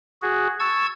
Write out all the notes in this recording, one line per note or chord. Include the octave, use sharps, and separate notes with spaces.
F#4 G#4
A5 C#6 E6 G#6